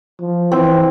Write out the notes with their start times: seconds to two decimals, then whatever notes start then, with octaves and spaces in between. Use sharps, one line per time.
0.21 F3
0.52 E3 C4